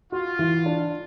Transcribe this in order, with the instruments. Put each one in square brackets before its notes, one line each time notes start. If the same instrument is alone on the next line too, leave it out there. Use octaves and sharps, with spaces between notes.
[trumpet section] F4 [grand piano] F#4
[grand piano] E3
D4